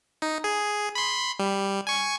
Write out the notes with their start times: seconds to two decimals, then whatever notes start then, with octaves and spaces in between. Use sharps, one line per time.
0.22 D#4
0.44 G#4
0.95 B5 C6
1.39 G3
1.87 G#5 C#6